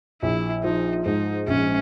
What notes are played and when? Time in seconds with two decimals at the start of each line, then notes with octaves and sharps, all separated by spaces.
0.22 A#1 E4
0.64 F3 D#4
1.05 G#2 D#4
1.47 A#1 C#4